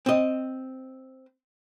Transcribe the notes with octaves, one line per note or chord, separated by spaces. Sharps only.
C4 D#5